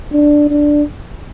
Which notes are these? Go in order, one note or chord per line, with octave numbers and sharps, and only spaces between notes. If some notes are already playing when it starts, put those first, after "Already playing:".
D4
D4